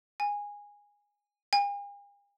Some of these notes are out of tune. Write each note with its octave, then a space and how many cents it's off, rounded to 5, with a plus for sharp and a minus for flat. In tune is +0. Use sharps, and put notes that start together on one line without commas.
G#5 -15
G#5 -45